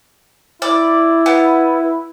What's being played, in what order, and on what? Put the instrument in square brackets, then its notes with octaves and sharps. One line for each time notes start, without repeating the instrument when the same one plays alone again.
[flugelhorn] E4 [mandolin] D5
[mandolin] B3